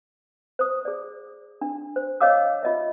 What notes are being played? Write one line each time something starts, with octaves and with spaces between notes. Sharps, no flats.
C5 D#6
G#4 D5
D4
C5
C#5 D#5 F5 D6 E6
F4 D#5 E5